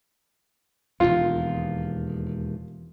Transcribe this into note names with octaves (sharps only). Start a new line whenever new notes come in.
E1 D#2 F4